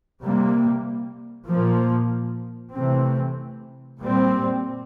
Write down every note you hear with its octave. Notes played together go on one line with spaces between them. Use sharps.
C3 G3 A#3
A#2 F3 A#3
C3 E3 A3 C4
A#2 G3 C4